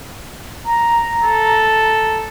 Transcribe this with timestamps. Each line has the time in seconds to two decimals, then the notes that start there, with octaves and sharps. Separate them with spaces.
0.66 A#5
1.23 A4